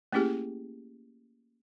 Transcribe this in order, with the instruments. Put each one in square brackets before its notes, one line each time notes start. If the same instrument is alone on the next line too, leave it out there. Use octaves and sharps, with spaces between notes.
[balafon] A3 A#3 C#4 E4 G4 G#4